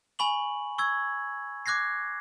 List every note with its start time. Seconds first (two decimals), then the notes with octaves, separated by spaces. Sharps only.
0.19 G#5 B5 C#6 F#7
0.78 C#6 E6 G#6
1.66 D6 F#6 G#6 A#6 C7